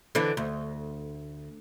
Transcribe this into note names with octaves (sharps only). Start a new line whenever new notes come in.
D3 E3 D4
D2